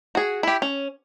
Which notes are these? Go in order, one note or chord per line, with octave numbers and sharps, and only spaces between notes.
F#4 G#4
E4 G4
C#4